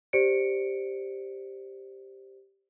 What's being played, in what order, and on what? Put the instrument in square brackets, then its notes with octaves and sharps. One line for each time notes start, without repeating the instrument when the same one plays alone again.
[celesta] G4 C5 D5 C#7 D7